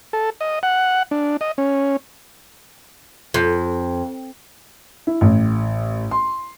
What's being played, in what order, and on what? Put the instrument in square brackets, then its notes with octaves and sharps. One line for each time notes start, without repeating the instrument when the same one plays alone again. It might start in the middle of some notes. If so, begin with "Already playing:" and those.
[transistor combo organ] A4
D#5
F#5
D4
D#5
C#4
[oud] F2
[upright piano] E4
A1
C6